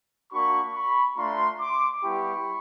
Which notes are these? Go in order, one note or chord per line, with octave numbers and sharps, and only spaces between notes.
A#3 D4 F#4 B5 C#6
B5 C#6
A3 D4 F4 A#5 C6
C6 D6
G3 B3 E4 G4 B5 C#6